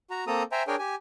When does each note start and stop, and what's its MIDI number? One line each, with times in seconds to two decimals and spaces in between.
0.11 0.24 66
0.11 0.24 82
0.27 0.43 58
0.27 0.43 60
0.27 0.43 69
0.27 0.43 82
0.27 0.43 87
0.52 0.63 72
0.52 0.63 76
0.52 0.63 79
0.52 0.63 80
0.52 0.63 82
0.67 0.75 62
0.67 0.75 68
0.67 0.75 70
0.67 0.75 73
0.67 0.75 79
0.67 0.75 80
0.79 0.95 67
0.79 0.95 80